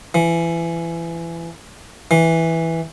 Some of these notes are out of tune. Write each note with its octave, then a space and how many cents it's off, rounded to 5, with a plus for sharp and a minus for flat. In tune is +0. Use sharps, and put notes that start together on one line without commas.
E3 +25
E3 -5